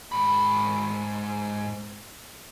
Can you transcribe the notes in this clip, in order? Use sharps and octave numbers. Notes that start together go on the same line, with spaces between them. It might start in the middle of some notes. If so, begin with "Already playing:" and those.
G#2 B5